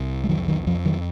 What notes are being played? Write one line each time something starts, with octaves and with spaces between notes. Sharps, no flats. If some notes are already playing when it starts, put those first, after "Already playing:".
Already playing: C2
G#3
F2 D#3 F#3
D#3 F#3
F2 F3
D#3 F#3